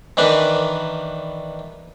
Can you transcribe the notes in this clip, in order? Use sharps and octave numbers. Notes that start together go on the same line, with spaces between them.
D#3 E3 D4 A#4 B4